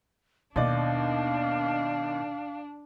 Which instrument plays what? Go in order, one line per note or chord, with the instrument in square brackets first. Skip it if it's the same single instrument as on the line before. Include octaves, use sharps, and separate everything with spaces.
[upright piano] D#2 D#4 D5 [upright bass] B2 [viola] D4 [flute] F5